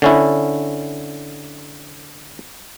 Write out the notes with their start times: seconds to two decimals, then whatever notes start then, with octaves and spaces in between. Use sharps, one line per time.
0.02 D3 C#4 E4